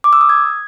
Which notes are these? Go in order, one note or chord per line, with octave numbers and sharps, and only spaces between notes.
D6
E6
D#6
G#6